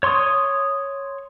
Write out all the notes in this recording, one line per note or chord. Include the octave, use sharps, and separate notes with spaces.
C#5 C6 C#6 D#6